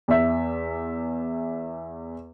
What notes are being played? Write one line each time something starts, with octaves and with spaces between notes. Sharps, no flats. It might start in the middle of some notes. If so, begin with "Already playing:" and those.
E2 E5